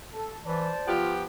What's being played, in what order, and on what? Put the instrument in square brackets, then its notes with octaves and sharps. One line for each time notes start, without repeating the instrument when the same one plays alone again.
[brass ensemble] A4
[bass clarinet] E3 [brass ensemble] C5 D5 A5
[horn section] F3 B3 G4 [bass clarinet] F4